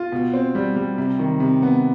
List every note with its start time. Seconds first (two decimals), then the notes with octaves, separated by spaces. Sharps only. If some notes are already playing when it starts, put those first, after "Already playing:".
Already playing: F4
0.12 B2
0.33 C4
0.55 G3
0.76 G3
0.98 C3
1.19 D#3
1.40 C3
1.62 B3